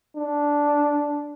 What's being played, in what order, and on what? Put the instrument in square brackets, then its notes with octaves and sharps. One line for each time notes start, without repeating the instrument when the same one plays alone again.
[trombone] D4